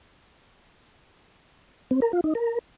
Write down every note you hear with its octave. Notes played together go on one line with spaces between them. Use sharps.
C4
A#4
F4
D#4
A#4